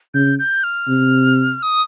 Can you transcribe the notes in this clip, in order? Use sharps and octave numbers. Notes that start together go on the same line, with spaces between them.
C#3 G6
G6
F6
C3
D#6